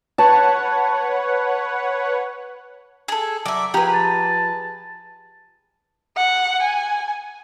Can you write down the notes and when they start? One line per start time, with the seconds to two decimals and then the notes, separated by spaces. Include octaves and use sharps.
0.18 B4 C#5 F#5 A5
3.08 G#4 A4
3.46 F#3 D5 E5
3.74 F3 G4 G#4 B4 A#5
3.93 A5
6.17 F#5
6.62 G#5